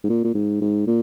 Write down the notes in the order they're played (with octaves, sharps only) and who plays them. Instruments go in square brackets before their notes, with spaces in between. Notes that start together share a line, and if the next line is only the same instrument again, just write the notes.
[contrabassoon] G#2
A#2
A#2
G#2
G#2
A#2